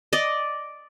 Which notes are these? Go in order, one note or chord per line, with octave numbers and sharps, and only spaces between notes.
D5 D#5